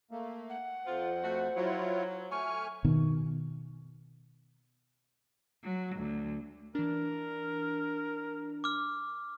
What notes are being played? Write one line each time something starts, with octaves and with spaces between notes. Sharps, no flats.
A3 A#3
F#5
F2 F4 C5
A3 F#4
F#3 E4 F4 C#5
A3 G#5 C#6 F6
B2 D#3
F#3
D2
E3 D4 A#4
D6 F6